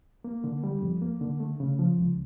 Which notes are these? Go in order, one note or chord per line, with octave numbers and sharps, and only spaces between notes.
A#3
D3
G3
F2
A#3
D3
A3
C#3
F3
C#2